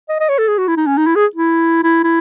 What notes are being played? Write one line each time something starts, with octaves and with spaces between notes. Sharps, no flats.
D#5
D#5
C#5
A4
G#4
F#4
E4
D#4
C#4
D#4
E4
G#4
E4
E4
E4